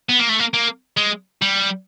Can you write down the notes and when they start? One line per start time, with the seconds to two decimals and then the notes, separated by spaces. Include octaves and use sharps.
0.09 B3
0.19 A#3
0.29 A3
0.39 A#3
0.54 A#3
0.97 G#3
1.42 G3